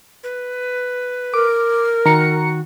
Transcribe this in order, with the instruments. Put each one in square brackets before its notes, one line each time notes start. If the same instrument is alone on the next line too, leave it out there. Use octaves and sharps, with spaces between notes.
[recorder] B4
[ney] A#4 [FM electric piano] D6
[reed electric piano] D#3 [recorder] F#4 [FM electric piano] A#5 C#7